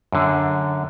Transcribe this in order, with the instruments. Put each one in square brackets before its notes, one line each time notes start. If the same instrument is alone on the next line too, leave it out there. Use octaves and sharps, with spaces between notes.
[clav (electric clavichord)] F#2 D3